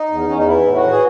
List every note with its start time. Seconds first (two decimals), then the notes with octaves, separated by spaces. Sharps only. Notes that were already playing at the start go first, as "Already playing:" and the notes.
Already playing: D#4
0.11 E2
0.28 E2 C#4
0.38 D#4
0.48 E3 E4
0.66 A2
0.75 F#4
0.84 E3
0.91 G#4